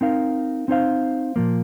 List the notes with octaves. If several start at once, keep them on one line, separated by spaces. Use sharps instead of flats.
C4 D#4 A#4 F5
C4 D#4 C5 F5
A#2 F3 A#3